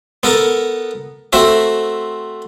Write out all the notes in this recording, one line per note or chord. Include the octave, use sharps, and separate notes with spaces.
B3 A4 A#4
A3 C4 F#4 E5